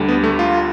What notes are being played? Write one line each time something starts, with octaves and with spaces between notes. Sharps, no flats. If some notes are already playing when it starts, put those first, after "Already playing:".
Already playing: D2 D3 G3
B3
A3
F4